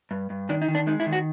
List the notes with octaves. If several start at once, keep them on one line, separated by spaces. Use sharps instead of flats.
G2
G2
D#3 D4
D#4
D#3
D4
G#3 D#4
E4
D#3
F#4